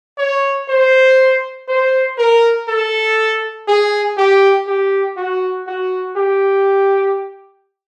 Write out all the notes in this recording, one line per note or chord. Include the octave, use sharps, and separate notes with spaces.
C#5
C5
C5
A#4
A4
G#4
G4
G4
F#4
F#4
G4